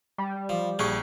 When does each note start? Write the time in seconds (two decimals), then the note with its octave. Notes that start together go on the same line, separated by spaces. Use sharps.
0.18 G3
0.49 F3
0.79 A#1 G4 G#4 C#6